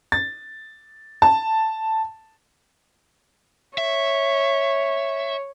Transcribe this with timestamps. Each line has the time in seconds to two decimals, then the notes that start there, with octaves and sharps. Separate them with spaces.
0.12 A6
1.22 A5
3.78 C#5 E5